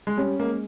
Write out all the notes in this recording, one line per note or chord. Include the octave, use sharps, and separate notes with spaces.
G#3
G3 C#4
G#3 A#3